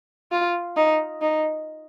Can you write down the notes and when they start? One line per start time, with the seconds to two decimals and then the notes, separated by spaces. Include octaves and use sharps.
0.32 F4
0.77 D#4
1.22 D#4